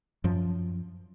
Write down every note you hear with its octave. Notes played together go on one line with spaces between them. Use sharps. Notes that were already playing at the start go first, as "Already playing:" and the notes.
F#2 F3